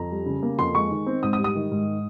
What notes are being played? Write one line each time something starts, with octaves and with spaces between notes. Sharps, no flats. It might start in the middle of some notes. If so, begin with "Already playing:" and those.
Already playing: F2 A#5
G3
C#3
A#3
F2 C6
G#3 C#6
D#3
C4
G#2 D#6
D#6
G3
D#6
D#3
G#2